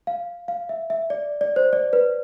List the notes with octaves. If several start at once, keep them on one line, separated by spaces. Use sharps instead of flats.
F5
F5
E5
E5
D5
D5
C5
D5
B4